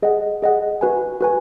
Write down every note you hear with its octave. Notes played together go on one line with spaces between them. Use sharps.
G#4 D#5 F#5
G#4 D#5 F#5
F#4 B4 G#5
F#4 B4 G#5